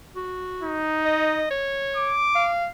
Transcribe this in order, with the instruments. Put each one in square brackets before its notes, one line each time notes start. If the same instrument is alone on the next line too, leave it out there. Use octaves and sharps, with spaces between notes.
[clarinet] F#4
[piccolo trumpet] D#4
[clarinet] D#5
C#5
[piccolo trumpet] D6
[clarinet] F5